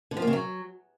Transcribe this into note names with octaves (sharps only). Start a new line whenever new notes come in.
D3
F3
A#3
C#3
F#3